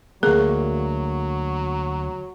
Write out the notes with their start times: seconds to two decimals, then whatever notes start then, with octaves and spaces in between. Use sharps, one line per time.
0.23 D2 F#3 A#3 G#4